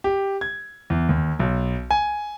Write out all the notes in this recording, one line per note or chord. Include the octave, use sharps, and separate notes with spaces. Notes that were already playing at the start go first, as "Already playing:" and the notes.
G4
G#6
E2
D#2
B1
G#5